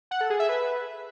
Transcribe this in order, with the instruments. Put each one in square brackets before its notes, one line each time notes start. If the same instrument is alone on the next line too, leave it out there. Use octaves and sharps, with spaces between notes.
[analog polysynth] F#5
A4
G#4
E5
B4